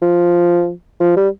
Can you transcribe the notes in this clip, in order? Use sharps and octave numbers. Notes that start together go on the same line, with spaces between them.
F3
F3
G3